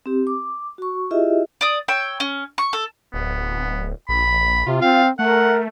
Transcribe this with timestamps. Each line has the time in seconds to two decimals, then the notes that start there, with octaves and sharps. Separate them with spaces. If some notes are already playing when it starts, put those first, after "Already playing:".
0.06 C4 G4
0.27 D6
0.78 F#4 C#6
1.11 E4 F4 G4 G#4 D#5 E5
1.61 D5 D#6
1.88 C#5 G5 E6
2.20 C#4
2.58 C#6
2.73 A4
3.14 D1 B3
4.09 A#1 B5
4.66 C3 F4
4.82 C4 F5
5.19 A3 A#4 F#5